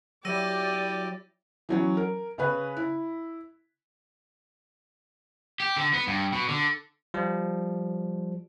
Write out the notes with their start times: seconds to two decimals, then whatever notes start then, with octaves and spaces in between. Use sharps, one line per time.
0.25 F#3 E4 G4 D5 E6 A#6 D#7
1.69 E3 F#3 C#4
1.97 A#4
2.38 C#3 C#4 B4
2.76 E4
5.60 G4
5.76 D3
5.93 B3
6.07 G2
6.32 B2
6.48 D3
7.14 F3 G3